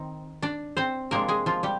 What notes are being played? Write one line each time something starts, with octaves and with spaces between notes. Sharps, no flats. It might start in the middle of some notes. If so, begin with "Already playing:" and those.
Already playing: D#3 C4 D#4
D4 D5
C4 C5
C3 F3 G#3 A#3 D4 A#4
G#3 G#4
F3 F4
G3 G4